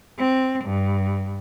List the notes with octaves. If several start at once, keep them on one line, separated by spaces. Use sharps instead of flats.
C4
G2